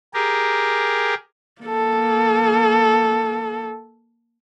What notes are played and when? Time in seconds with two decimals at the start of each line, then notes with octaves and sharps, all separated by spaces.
0.14 G4 G#4 A#4
1.61 A#3 A4